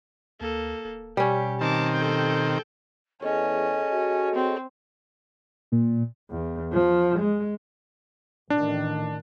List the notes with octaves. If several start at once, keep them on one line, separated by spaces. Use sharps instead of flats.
D2 A#3 A4
D1
B2 G3 C#4 G4
D#3 C4 A5 D6
A4 G5
E2 C#4 G#4 A4 C#5 D#5
F#4
C4
A#2
E2
F3
G#3
A1 D#3 D4